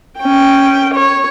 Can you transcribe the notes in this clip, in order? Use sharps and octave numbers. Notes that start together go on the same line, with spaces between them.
C#4 G5
C#5